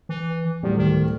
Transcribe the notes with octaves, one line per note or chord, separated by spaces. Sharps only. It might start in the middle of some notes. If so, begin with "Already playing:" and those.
E3
D1 E2 G3
D#3